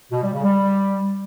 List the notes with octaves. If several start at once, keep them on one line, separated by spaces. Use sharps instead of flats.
B2
G3
C#3
G3